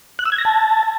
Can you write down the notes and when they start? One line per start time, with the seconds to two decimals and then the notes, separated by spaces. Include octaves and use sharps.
0.19 F#6
0.25 E6
0.32 G#6
0.38 A#6
0.45 A5